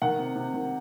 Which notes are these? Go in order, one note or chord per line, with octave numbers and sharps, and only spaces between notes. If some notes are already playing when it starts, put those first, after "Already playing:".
D#3 F#5
C3
C3
D#3